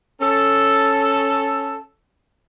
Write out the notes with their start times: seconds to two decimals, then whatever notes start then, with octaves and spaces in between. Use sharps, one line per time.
0.21 C#4 A4